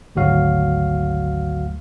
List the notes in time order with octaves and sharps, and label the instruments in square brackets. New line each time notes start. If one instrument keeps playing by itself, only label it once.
[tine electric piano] G#1 D2 F#3 F#4 F5